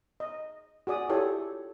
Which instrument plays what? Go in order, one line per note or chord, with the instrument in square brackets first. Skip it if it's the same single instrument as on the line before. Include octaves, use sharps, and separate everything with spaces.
[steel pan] D#5
F#4 G#4 D5 D#6
E4 F4 G4 A4 C#5 D5